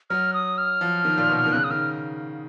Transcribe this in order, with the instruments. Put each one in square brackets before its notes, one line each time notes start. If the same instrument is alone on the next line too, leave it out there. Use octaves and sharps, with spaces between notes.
[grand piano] F#3 [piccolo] F6
[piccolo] D#6
F6
[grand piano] F3
D#3
A#2
B2
D#3
[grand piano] C#3 [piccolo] F#6
[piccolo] D#6
[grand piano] D#3 [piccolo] F6